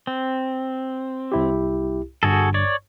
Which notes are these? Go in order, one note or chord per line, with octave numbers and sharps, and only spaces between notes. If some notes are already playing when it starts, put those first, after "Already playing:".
C4
C2 E4 G4
G1 G2 F#4 G#4 A4
C#5 D5